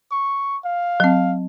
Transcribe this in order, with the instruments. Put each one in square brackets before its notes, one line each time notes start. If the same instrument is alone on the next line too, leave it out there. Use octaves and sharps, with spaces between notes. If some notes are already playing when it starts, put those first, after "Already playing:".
[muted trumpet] C#6
F5
[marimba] F#3 C4